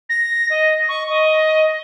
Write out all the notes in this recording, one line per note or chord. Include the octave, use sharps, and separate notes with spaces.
A#6
D#5
C#6
D#5